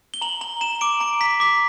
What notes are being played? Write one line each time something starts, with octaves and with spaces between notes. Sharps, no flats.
G7
A#5 F#7
A#5 F#7
A#5 E7
D6 D7
A#5 D7
A#5 B6
D6 B6